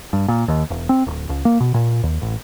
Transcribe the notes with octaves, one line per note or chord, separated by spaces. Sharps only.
G2
A#2
D#2
E1
C4
D1
C#2
A#3
B2
A#2
D#2
A1